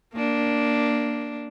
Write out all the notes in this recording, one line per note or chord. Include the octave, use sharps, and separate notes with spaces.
A#3 D4